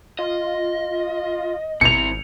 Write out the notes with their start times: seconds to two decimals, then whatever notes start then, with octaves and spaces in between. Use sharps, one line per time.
0.19 F4 D#5
1.81 G#1 C4 E4 C#7 F7